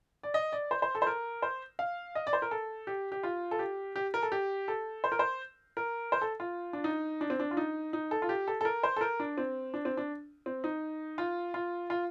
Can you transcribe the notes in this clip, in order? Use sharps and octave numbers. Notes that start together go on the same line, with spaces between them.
D5
D#5
D5
C5
C5
A4
C5
A#4
C5
F5
D#5
D5
C5
A#4
A4
G4
G4
F4
A4
G4
G4
A#4
A4
G4
A4
C5
A#4
C5
A#4
C5
A4
F4
D4
D#4
D4
C4
D4
F4
D#4
D#4
A4
F4
G4
A4
A4
A#4
C5
A4
A#4
D4
C4
D4
C4
D4
C4
D#4
F4
F4
F4